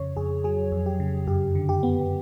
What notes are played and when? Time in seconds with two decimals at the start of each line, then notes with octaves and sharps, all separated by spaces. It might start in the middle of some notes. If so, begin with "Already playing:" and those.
Already playing: F2 C#3 C#5
0.16 F2 G#4
0.44 F#3 G#4
0.72 F2
0.86 G4
1.00 C#3
1.27 F#2 G4
1.55 D3
1.69 G4
1.83 B3